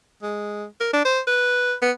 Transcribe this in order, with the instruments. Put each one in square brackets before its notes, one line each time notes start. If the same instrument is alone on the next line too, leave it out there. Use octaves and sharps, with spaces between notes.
[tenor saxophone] G#3
A#4
D4
C5
B4
B3